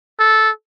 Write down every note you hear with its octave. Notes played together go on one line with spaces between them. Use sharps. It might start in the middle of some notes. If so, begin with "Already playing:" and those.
A4